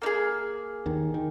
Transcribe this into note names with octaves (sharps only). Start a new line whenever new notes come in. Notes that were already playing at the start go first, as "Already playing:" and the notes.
A#3 D#4 G#4
D#2 D#3
D#3